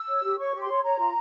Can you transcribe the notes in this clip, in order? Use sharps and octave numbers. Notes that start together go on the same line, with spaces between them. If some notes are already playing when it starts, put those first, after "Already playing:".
Already playing: E6
C#5
G4
C#5 C#6
G4
C6
C#5
C#5 A#5
F4